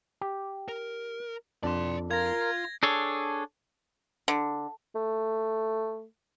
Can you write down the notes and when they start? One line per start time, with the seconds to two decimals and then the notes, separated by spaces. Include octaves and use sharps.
0.21 G4
0.68 A#4
1.63 F2 D4 D5 C6
2.11 F4 A#4 F5 G#6 A#6
2.83 D4 G#4 A4 C#5
4.28 D3
4.95 A3